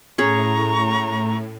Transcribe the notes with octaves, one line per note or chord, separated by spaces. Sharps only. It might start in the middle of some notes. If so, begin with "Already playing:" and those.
A2 C#4 G#4 C#5 A#5 C#6